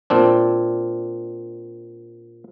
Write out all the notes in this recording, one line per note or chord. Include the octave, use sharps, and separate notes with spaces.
A#2 C4 D4